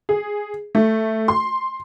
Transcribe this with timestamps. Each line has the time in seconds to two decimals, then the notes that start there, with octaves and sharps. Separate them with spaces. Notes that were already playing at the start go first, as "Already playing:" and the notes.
0.09 G#4
0.75 A3
1.28 C6